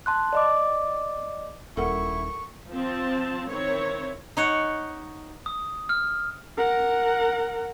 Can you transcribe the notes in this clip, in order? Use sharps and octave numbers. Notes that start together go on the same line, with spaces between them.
A5 C6 F#6
D5 D#5 D6
D#1 E4 A4 A#4 F#5 C#6
F3 C4 A5
D#3 C4 E4 C#5
D#4 C#5 F#5
D#6
F6
A#4 F#5